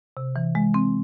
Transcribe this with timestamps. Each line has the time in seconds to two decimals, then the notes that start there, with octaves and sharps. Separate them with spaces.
0.17 C3
0.36 E3
0.55 G#3
0.74 C4